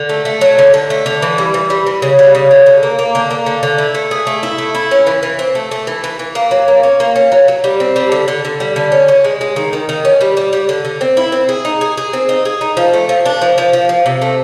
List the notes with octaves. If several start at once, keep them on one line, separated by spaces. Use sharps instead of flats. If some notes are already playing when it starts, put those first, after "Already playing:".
Already playing: D3
A3
A3
F#3
D3
D3
A3
D3
E3
G3
E3
G3
E3
C#3
G3
C#3
D3
D3
A#3
A#3
D3
A#3
D3
D3
E4
A3
G#4
A3
E4
A3
E4
C#4
E3
E3
C4
A3
A3
E3
E3
E3
A#3
F#3
A#3
C#4
A#3
C#4
F#3
F#3
G3
C4
G3
D3
D3
D3
G3
D3
C#4
C#4
G#3
G#3
D#3
D#3
D#3
C#4
G3
G3
G3
D3
D3
C4
E4
C4
G#4
D#4
G#4
G#4
C4
D#4
G#4
D#4
F3
A3
F3
D4
F3
F3
F3
F3
C3
A3